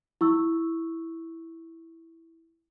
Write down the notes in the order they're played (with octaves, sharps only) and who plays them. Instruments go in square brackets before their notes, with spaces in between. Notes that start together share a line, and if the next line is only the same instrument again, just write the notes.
[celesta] E4 C#6 E6